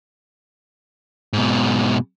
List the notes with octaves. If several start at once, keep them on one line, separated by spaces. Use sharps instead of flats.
G#2 B2